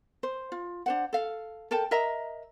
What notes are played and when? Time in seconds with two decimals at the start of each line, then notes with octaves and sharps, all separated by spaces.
0.23 C5
0.52 F4
0.86 D4 C5 F#5
1.13 A4 F5
1.71 A4 A#4 G5 A5
1.91 A#4 D#5 E5 A#5